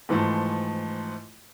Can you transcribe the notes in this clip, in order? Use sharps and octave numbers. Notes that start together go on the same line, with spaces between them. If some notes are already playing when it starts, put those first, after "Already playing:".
G#2 E3 F3 A3